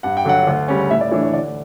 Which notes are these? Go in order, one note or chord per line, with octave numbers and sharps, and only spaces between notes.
G2 F#5
G5
D3 F#3 F#5
D2
C#3 G3 C#4
A2 E5
D5
E3 A3 D4 C#5
C#5
D2 D5